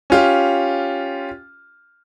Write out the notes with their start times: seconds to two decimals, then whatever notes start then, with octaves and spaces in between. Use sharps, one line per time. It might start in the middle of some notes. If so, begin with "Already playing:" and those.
0.10 C#4 F4 G4